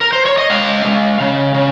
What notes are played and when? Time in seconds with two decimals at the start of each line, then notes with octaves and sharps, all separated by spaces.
0.01 A#4
0.13 C5
0.25 C#5
0.38 D#5
0.50 G#3 F5
0.85 G#3
1.20 C#3
1.54 C#3